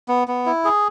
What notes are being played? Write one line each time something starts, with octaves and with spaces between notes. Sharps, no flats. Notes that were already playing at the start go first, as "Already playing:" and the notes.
B3
B3
E4
G#4